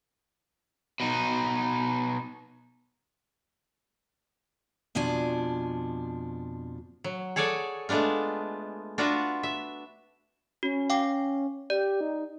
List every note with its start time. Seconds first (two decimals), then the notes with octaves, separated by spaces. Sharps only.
1.00 B2 D#4
4.95 F2 B2 F3 D4 G#5
7.04 F#3
7.36 G#4 A4 C#5 D5 F#5 G#5
7.89 G#3 A3 B3 D4 F4
8.98 D4 F4 F#4 B4 E5 F#5
9.43 E5
10.63 C#4 F#4
10.90 F5 G5 D6
11.70 G4 D5
12.01 D#4